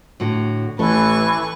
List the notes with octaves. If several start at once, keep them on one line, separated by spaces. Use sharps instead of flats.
A2 D3 F#4
A1 E3 A4 B4 C#6